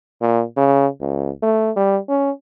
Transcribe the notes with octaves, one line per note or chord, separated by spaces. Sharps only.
A#2
C#3
C#2
A3
G3
C#4